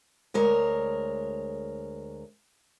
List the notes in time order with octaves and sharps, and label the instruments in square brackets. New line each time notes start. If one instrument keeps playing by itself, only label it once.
[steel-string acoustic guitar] D2 G#3 A#4 C#5